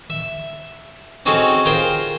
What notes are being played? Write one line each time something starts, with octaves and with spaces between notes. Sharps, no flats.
E5
C4 C#4 D#4 F#4 G#4 A4
F4 G#4 A#4 C5 F5 G5